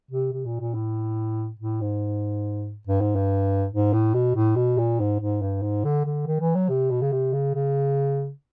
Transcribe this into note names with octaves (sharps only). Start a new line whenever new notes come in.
C3
C3
A#2
A#2
A2
A2
G#2
G2
G#2
G2
G#2
A2
B2
A2
B2
A#2
G#2
G#2
G2
G#2
D3
D3
D#3
E3
F#3
C3
B2
C#3
C3
C#3
C#3